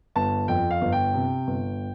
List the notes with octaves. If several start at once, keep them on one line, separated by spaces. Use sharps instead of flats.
G1 A5
F2 G5
F5
G1
G5
C3
G1